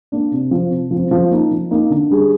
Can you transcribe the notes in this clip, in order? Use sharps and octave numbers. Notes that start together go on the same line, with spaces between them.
A#3 D4
C3
F3 C4
C3
F3 C4
F3
A#3 D#4
F3
A#3 D#4
D3
G3 D4 G#4